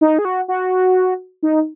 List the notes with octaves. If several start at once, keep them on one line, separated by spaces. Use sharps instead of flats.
D#4
G#4
F#4
F#4
D#4